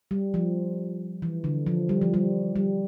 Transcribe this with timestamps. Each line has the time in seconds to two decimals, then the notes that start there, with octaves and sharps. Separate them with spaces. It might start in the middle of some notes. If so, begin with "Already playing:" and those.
0.11 G3
0.34 F3
1.22 E3
1.44 D3
1.67 F3
1.89 G3
2.01 F3
2.14 G3
2.56 G3